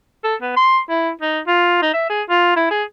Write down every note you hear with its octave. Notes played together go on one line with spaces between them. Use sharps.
A4
B3
C6
E4
D#4
F4
D#4
E5
G#4
F4
E4
G#4